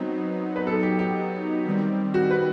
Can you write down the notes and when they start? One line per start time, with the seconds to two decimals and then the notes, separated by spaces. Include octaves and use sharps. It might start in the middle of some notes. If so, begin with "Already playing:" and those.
Already playing: F#3 B3 C4 D#4
0.56 B4
0.67 A4
0.83 G4
0.99 G4
1.65 D#3 G3 C4
2.14 F#4
2.31 B4